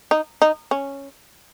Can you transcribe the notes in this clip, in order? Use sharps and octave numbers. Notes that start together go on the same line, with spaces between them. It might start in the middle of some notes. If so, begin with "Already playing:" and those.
D#4
D#4
C#4